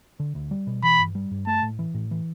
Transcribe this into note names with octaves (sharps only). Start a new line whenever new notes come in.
D3
D2
G3
B2
E3 B5
G2
G3
G2
A3 A5
A2
E3
A2
E3